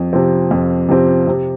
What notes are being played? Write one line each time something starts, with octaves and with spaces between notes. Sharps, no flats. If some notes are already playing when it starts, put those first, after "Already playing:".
Already playing: F2
C3 F3 C4
F2
C3 F3 C4
C3